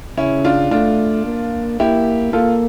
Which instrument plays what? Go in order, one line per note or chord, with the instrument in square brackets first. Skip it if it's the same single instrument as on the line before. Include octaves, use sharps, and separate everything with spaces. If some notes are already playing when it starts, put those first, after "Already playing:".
[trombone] C#3 [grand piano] C#4 E4
[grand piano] D4 F4
[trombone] A3 [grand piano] D4 F4
[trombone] A#3
[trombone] A#3 [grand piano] E4 G4
[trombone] A#3 [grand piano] F4 A4